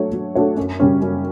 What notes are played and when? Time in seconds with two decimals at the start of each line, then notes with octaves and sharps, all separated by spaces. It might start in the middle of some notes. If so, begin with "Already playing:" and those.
Already playing: F#3 A3 D4 F#4 C#5
0.13 F#3
0.35 A3 D4 F#4 C#5
0.57 F#2
0.80 C#3 G3 C#4
1.02 F#2